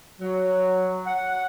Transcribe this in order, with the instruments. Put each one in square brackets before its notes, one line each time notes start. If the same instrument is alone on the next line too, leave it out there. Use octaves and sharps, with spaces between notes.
[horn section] F#3
F#5